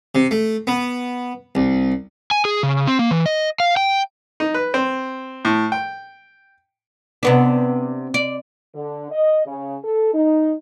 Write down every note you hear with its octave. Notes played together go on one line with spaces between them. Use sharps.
C3
A3
B3
C2
G#5
G#4
C#3
C4
A#3
E3
D#5
F5
G5
D#4
B4
C4
A2
G5
C3 B3 D4
D5
D3
D#5
C#3
A4
D#4